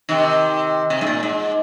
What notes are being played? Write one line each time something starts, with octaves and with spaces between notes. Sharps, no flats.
C3 D#3
C3
G#2
A#2
G#2